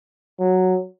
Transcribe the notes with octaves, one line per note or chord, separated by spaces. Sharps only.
F#3